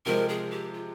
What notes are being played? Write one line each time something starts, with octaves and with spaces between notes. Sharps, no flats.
C3 F3 G#3 C4 A#4
G#4
G4
F4